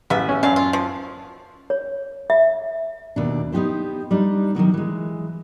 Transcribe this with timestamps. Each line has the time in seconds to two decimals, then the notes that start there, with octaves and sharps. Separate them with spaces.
0.10 A1 B3 E5
0.29 C#4
0.43 F#2 D4 F5
0.56 F4
0.73 F3
1.70 C#5
2.30 E5
3.16 D#2 B2 D4
3.52 B3 D#4 F4 G4 C5
4.11 G3 D4 D#4
4.55 D#3 F3 F#3 B3
4.74 E3 G#3